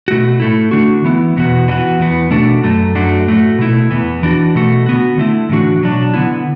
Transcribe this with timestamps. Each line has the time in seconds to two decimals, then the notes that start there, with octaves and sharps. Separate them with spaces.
0.08 B2 A3 F#4
0.40 A2 A3 E4
0.71 D3 A3 D4 F#4
1.04 E3 B3 E4
1.36 E2 B2 B3 F#4
1.68 E3 B3 D4 F#4
1.99 E2 E3 B3
2.31 B2 A3 D4 F#4
2.64 F#2 F#3 A3
2.95 F#2 F#3 A3 D4 F#4
3.27 A2 A3 F#4
3.59 B2 A3 E4
3.91 E2 E3 B3
4.23 E3 D4 F#4
4.55 B2 A3 F#4
4.86 D3 B3 F#4
5.18 D3 A3 E4
5.49 A2 E3 D4 F#4
5.81 B2 F#3 D4
6.14 D3 B3 E4